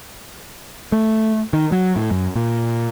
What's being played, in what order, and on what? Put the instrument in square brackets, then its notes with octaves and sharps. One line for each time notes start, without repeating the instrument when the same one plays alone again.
[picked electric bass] A3
D#3
F#3
A2
F#2
A#2